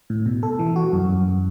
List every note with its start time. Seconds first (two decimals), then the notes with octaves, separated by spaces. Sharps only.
0.10 A2
0.26 B2
0.43 A4
0.59 E3
0.76 F#4
0.93 F#2
1.09 F#2